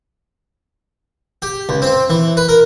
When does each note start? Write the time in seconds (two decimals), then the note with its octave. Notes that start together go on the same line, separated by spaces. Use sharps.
1.42 G4
1.69 C#2
1.82 C4
2.10 E3
2.37 B4
2.49 A#4